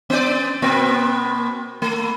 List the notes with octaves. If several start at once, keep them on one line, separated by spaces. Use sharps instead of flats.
B3 D5
B2 A#3 C4
A3